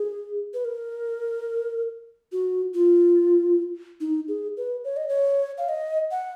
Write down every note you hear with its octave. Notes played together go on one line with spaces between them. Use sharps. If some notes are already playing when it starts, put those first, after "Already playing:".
Already playing: G#4
B4
A#4
F#4
F4
D#4
G#4
B4
C#5
D#5
C#5
F5
D#5
F#5